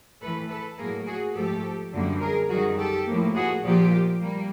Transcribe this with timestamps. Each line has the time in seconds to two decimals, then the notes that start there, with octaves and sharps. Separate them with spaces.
0.21 A2 E3 A3 A4 B4
0.49 A4 B4
0.78 A2 F#3 A#3 G#4 A#4
1.06 F#4 G#4
1.35 G#2 F3 A3 G4 A4
1.92 F#2 D3 G3 A#3
2.21 G#4 A#4
2.49 F#2 D#3 G3 F#4 G#4
2.78 G4 A4
3.06 A2 F3 A#3
3.35 F#4 G#4
3.63 A#2 F3 A#3 F4 G4
4.21 G3 A#3